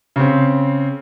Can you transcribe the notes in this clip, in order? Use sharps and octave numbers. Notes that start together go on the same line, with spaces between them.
C#3 C4